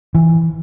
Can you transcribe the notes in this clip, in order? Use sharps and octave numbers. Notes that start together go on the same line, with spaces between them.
E3